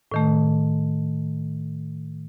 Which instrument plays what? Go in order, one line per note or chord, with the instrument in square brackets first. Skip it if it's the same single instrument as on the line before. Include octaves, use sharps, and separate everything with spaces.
[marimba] A2 D#3 A3